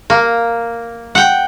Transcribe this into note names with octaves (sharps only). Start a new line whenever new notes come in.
A#3
F#5 G5